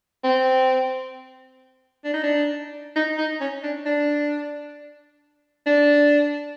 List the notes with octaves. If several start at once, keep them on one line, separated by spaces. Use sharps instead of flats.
C4
D4
D#4
D4
D#4
D#4
C#4
D4
D4
D4